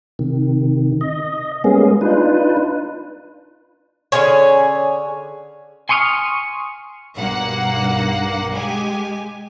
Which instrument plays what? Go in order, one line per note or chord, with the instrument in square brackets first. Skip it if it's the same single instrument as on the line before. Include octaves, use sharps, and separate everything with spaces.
[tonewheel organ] C3 D#3
D#5
G3 G#3 A#3 B3 C#4 G#4
D4 D#4 F4 B4
[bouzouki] D3 C#4 G#4 C#5
[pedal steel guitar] G#5 C6 C#6 D#6 F6
[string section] B1 G2 A#3 F#5
G#3 G4 G#5